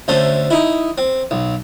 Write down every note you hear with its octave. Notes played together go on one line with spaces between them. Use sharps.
D2 A3 C#4 C5
D#4 E4
C4
B1